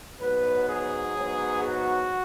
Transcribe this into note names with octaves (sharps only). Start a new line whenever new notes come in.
G#2 F#3 B3 B4
G#4
G#2 F#3 B3
F#4